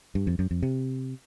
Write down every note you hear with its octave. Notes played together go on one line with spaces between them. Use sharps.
G2
F2
F#2
F2
C3